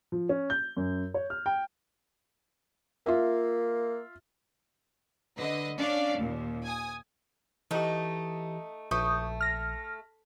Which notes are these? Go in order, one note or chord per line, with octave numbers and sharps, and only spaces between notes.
F3
C#4
G6
F#2
C#5
F6
G5
A#3 F4 E5
D3 B4 D#5
C#4 D4 D5 F5
D#2 A#2
G#5 D#6
E3 A3 D#4 G4
A#1 A3 C#6 D#6 G6
F6 A#6